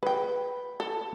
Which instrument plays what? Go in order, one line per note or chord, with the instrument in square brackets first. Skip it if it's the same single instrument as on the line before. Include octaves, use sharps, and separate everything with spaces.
[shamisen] G#4 G5 [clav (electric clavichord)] B4
[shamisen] A4